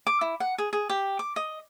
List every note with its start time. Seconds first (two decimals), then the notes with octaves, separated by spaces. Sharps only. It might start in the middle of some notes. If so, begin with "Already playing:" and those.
0.07 D6
0.21 E4
0.40 F#5
0.58 G#4
0.73 G#4
0.90 G4
1.19 D6
1.36 D#5